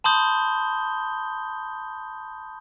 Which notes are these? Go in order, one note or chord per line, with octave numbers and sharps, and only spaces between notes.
A5 B5 C6 D#6 G6 G7